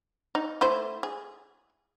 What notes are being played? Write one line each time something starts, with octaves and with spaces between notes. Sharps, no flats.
D#4
A3 E4 C5
G#4